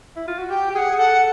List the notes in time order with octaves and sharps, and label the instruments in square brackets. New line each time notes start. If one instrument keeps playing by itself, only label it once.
[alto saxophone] E4
F4
F#4
[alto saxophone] G4 [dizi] G5
[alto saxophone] G4
[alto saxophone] G#4 [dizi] F#5 G5
[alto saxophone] G#4
[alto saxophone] A4 [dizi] F#5